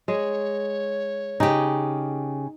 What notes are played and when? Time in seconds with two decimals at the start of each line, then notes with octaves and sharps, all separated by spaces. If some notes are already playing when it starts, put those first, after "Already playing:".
0.08 G#3 C#5
1.40 C#3 D#4 G4